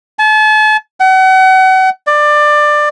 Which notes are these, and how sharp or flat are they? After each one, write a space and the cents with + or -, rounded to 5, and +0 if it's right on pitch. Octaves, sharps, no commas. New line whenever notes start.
A5 -40
F#5 +35
D5 +20